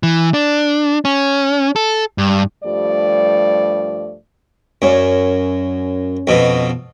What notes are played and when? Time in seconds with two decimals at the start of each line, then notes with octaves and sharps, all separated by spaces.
0.03 E3
0.34 D4
1.05 C#4
1.76 A4
2.18 G2
2.64 G2 F3 G3 A3 D5
4.82 F#2 C#4 C#5 D5
6.27 F2 B2